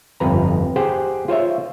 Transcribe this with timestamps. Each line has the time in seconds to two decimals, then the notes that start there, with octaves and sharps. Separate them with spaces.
0.20 G1 F2 B4 A#5
0.76 G4 G#4 C5 F#5
1.28 F4 C5 C#5 E5